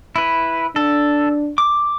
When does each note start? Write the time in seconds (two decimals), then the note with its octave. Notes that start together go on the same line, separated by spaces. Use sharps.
0.16 E4 B4
0.76 D4 A4
1.58 D6